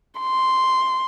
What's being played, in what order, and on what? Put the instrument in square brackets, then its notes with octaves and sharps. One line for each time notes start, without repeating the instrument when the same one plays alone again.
[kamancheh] C6